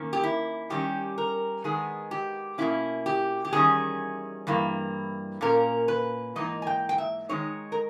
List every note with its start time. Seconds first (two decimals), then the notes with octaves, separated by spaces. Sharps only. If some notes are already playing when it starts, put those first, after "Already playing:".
Already playing: D#3 A#3 C#4
0.13 G4
0.23 E4
0.70 D#3 G3 C#4 G4
1.18 A#4
1.64 D#3 G#3 B3 G#4
2.11 G4
2.58 B2 A#3 C#4 E4
3.06 G4
3.45 G4
3.53 E2 D#3 G3 C#4 G#4
4.47 G2 E3 A#3
5.41 A#2 A#3 C#4 A#4
5.88 B4
6.35 G#2 E3 A#3 D#4 D#5
6.62 G#5
6.67 G5
6.89 G5
6.98 E5
7.29 D#3 G#3 D#4 C#5
7.72 A#4